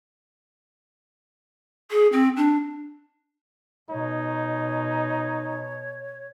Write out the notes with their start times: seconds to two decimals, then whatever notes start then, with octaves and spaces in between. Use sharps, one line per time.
1.90 G#4
2.12 C4
2.36 D4
3.90 B2 D#4 C#5